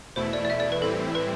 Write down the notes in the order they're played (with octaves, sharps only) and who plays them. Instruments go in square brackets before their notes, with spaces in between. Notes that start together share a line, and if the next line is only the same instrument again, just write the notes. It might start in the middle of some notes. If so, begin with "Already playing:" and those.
[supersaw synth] E2 B2 A3 E4 [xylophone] C5
[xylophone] D5
D5
E5
D5
B4
[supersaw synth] A2 E3 G3 C4 E4 [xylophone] A4
[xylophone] B4